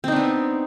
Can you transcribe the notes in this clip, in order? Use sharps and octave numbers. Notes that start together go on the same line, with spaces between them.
B3 C4 D4 D#4